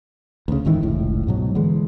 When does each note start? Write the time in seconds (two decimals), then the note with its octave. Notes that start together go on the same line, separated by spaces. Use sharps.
0.48 D2 C#3
0.65 G1 G#2 D#3 E3
0.83 F1 C#2 A2
1.27 G#2 B2 F#3
1.55 D3 E3 G#3